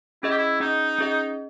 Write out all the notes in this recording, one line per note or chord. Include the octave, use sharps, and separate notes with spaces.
C#4 E4 G#4 D#5
G4
E4
C#4 D#4 G#4 D#5
C#4 G#4 D#5